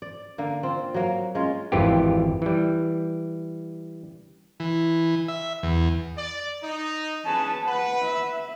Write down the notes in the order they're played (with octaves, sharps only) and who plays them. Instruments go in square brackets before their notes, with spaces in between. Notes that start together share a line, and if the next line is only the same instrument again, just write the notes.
[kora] D5
D3 A#3
C4 F4
F#3 A#3
G#3 C#4 F4
[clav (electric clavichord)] G#1 F2 E3 F4 G4
E3 G3
[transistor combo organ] E3
E5
E2
[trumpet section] D5
D#4
[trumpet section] C#4 G#4 B4 [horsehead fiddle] A5
[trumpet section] B4 [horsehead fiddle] F#5
[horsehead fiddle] E5